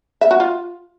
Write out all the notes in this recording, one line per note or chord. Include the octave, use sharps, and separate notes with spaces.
E5
F#4
F4